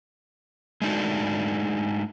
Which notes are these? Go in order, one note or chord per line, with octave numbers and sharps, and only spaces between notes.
G#3 A3 D4 D#4 F#4